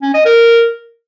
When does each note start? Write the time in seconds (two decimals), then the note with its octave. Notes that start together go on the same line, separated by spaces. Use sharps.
0.02 C#4
0.14 D#5
0.25 A#4